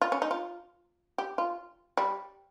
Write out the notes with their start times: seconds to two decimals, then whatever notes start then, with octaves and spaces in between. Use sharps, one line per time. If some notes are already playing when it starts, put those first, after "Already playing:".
0.01 F4
0.12 C#4
0.22 D#4
0.31 F4
1.18 G4
1.38 F4
1.97 G3